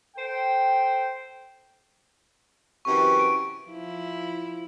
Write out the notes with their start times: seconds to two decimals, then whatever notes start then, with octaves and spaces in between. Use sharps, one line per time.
0.16 A4 C5 G5
2.85 F#2 C3 E3 C#6
3.19 D7
3.68 F3 E4